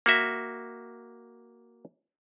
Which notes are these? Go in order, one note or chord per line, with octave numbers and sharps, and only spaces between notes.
A#3 F#4 E5